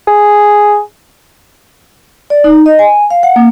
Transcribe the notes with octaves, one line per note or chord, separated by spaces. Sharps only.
G#4
D5
D#4
D#5
G#5
F5
F#5
A#3